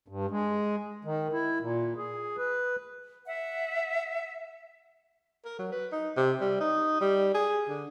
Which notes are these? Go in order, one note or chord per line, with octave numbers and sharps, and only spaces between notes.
G2
G#3
D#3
E4
A#2
G#4
B4
E5 F#5
A#4
F#3
B4
D#4
C3
G3
D#4
G3
G#4
D3